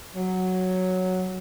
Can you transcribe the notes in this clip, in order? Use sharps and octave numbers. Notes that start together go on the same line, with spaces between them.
F#3